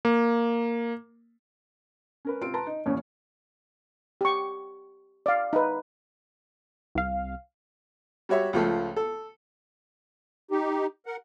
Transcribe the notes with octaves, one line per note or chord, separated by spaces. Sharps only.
A#3
C#4 A#4 B4
C3 C4 F4 D7
B4 A5 A#5 C6
D#4
A1 D#2 A#2 C#4
G4 C#6
D5 F5
D#4 B4
C2 F5
G3 F#4 C#5 E5
C#2 F3 A3
A4
D#4 G4
A#4 F#5